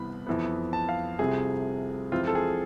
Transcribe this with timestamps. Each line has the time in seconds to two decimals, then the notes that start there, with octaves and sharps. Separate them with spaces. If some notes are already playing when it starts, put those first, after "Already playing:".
Already playing: C2 C3 E3 B3 B5
0.27 F2 E3 B3
0.73 A5
0.89 F5
1.19 C2 C3 F3 A3 C4 G#4
2.12 F2 E3 G#3 C4 F4
2.27 A4
2.35 G#4